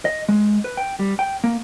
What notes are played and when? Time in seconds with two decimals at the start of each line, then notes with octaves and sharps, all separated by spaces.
0.05 D#5
0.28 G#3
0.64 B4
0.77 G5
0.99 G3
1.19 G5
1.44 A#3